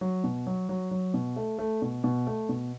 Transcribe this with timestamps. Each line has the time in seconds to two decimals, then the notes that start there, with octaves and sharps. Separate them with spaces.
0.01 F#3
0.24 B2
0.47 F#3
0.69 F#3
0.91 F#3
1.14 B2
1.36 A3
1.59 A3
1.82 B2
2.04 B2
2.27 A3
2.49 B2